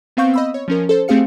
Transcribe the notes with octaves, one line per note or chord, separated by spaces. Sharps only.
B3 C4 F5 C#6 G6
D#5 B5 E6
C#5
F3 C#4 A#4
A4 C5
A3 C4 G4 G#4 F5 C#7